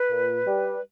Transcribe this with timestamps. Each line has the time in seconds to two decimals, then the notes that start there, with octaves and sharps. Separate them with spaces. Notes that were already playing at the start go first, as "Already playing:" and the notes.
Already playing: B4
0.10 A#2
0.47 G3